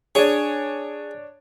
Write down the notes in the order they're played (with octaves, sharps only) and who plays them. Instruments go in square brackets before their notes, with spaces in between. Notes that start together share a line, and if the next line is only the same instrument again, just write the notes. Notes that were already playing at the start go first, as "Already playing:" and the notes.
[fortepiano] D4 C#5 [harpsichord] G#4